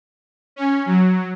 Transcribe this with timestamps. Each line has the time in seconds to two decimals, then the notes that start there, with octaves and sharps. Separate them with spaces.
0.56 C#4
0.86 F#3